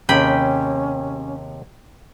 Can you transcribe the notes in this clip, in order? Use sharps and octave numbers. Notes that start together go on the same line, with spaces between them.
D#2 C3 C#4 G#4 G5 B5